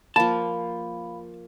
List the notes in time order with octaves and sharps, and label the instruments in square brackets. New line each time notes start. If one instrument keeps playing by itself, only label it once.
[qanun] F3 A#3 [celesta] F5 B5 [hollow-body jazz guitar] A5